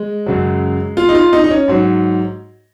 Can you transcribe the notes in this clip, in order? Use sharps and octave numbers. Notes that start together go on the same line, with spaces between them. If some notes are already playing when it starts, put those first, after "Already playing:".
Already playing: G#3
F#2 C#3 F#3
F4
D#4
F4
D#4
D#4
C#4
G#2 F#3